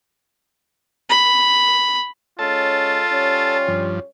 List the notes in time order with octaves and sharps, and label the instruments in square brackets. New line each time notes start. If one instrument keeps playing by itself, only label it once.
[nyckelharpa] B5
[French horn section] G#3 C#4 C#5 [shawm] F4 [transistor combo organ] A4 A5
[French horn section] G3 C#4 C#5
[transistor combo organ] G2 F3